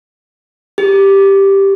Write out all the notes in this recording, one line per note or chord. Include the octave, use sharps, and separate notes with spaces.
G4